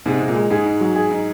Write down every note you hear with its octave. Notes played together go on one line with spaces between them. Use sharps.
G#2 C3 G#3
C3 G#4
A#2
G#3
G#2 G#4
D#4
F#3
G#4
D#4